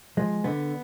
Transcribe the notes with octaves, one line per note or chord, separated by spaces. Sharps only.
F3 G#3
D3 B3